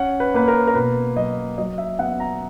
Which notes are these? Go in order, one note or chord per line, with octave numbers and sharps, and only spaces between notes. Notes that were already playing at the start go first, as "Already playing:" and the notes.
Already playing: C#4 F#5
B4
A#3 B4
A#4
A#4
B2 B4
F#3 D#5
F#3 D#5
E5
B3 F#5
A#5